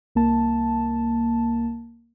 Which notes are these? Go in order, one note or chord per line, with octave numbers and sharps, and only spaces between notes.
C2 A#3 A5